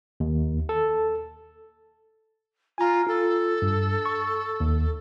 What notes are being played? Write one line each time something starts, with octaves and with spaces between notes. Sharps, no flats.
D#2
A4
F4 G#5 A#5
F4 A4
G2
C#6
D#2